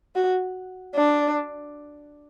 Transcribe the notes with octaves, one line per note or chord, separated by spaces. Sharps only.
F#4
D4